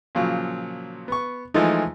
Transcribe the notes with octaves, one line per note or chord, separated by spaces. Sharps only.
A#2 C#3 F3 F#3
B3 C#6
E3 F3 G#3 A3 D#4